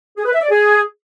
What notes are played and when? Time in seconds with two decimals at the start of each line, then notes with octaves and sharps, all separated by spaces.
0.17 G#4
0.25 B4
0.34 E5
0.42 D5
0.50 G#4